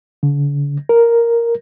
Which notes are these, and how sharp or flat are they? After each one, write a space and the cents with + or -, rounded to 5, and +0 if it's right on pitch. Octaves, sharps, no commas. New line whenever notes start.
D3 -45
A#4 +0